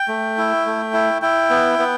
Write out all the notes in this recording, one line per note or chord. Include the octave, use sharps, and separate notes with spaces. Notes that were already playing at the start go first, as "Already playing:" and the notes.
Already playing: G5
A3
E4
A3
E4
E4 G5
B3
B3